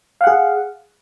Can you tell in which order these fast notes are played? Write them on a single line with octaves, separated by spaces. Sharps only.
F5 F#5 G#4